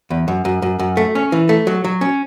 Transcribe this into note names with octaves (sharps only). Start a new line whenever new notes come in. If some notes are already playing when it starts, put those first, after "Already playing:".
E2
F#2
F#2
F#2
F#2
A3
C#4
E3
A3
F#3
F#3
C#4